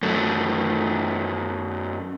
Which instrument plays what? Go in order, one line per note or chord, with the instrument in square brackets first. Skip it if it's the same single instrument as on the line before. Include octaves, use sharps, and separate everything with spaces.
[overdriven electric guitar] F#2 A3